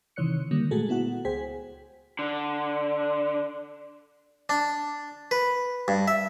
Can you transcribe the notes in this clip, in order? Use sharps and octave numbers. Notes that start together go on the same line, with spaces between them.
C3 D#3 E3 C#5 F#6 C#7
D3 D#3 G3 A#3
A#2 G#3 A3 F#4 G#4 A4
B3 E4 F#4 F#5
C#2 G#4 C5 G5 G#5 B6
D3
D4
B4
G2
E5